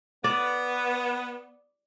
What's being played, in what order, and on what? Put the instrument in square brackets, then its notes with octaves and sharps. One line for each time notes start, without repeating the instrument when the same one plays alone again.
[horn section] B3 [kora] D5